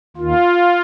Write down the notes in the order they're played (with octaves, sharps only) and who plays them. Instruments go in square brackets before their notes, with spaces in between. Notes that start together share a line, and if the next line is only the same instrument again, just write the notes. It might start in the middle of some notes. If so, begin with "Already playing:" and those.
[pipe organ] D#2 D#3 F4